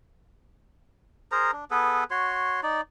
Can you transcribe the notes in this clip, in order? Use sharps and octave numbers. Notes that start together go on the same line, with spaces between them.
G#4 A#4 C5 A#5
D4
B3 G#4 A4 B4
F#4 C#5 C6
D#4 D5